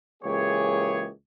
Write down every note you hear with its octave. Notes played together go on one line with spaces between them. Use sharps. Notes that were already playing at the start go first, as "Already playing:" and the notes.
C#2 E3 A#3 G4 G#4 C#5